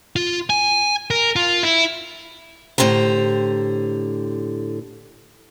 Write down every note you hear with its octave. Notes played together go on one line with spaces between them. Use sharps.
F4
G#5
A#4
F4
E4
A2 D3 G4 C5 A#5